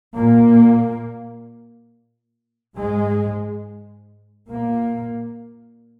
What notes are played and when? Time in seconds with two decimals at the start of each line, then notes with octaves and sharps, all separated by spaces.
0.15 A#2 A#3
2.75 G#2 G#3
4.49 A#2 A#3